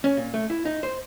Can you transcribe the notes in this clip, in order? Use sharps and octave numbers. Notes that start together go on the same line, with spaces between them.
C#4
A#2
A3
E4
D#4
C5